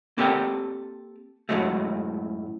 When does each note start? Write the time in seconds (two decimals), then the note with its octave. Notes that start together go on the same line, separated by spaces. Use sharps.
0.18 A#3 C4 G4 A4 G5
1.49 F#2 A2 C3 F#3 G#3 A3